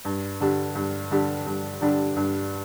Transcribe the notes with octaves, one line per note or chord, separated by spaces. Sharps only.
G2
D3 G3 D4 G4
G2
D3 G3 D4 G4
G2
D3 G3 D4 G4
G2